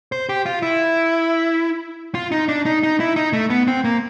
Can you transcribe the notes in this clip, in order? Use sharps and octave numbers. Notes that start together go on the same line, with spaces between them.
C5
G4
F4
E4
F4
D#4
D4
D#4
D#4
E4
D#4
A3
B3
C4
A#3